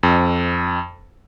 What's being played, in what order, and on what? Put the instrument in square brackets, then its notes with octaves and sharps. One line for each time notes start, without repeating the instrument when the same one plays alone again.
[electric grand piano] F2